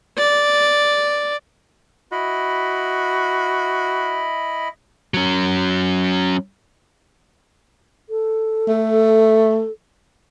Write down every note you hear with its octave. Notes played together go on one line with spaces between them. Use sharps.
D5
E4 F#4 D#5 B5
F#3 C#4
A4
A3